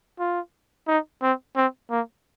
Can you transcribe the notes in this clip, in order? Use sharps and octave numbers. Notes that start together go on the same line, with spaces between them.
F4
D#4
C4
C4
A#3